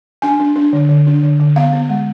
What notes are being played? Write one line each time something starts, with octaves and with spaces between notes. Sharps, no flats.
D4 G#5
D4
D4
D3
D3
D4
D3
D3
B3 F5
B3
G#3